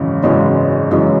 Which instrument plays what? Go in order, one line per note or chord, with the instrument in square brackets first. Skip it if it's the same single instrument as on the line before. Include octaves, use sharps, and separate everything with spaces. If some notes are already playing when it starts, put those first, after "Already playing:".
Already playing: [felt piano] G#1 F#2 C#3 E3 G#3
G#1 F#2 C#3 E3 G#3
G#1 F#2 C#3 E3 G#3